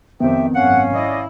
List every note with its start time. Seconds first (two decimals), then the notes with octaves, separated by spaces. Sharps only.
0.20 F2 D#3 B3 C4 G4 E5 G5
0.55 G#1 F#2 C#4 F5 F#5
0.94 E4 D5 D#5